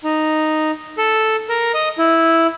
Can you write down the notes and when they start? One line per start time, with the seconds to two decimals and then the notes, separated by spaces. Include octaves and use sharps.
0.04 D#4
0.98 A4
1.49 A#4
1.74 D#5
1.98 E4